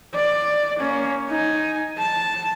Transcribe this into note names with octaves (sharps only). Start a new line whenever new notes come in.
D5
A#3 C#4
D#4 G#5
A5